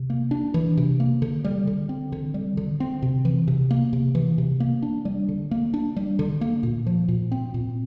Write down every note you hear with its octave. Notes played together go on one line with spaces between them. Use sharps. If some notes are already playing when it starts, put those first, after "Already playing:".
Already playing: C3
A#3
D4
E3
C3
A#3
D3
G3
D3
C4
D3
G3
D3
C4
C3
E3
C3
A#3
C3
E3
C3
A#3
D4
G3
D3
A#3
D4
G3
D3
A#3
A#2
F3
A#2
C4
A#2